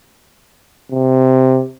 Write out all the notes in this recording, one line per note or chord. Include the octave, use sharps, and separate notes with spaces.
C3